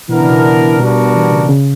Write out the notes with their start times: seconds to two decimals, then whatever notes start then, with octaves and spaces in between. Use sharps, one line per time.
0.09 B2 E3 B3 D4 A#4
0.20 C#3
0.29 B2
0.80 B2 G3 B3 D4 F#4 A#4
1.15 E3
1.32 C#3
1.49 C#3